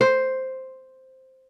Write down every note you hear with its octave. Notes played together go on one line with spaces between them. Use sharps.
C5